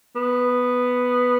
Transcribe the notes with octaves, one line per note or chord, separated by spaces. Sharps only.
B3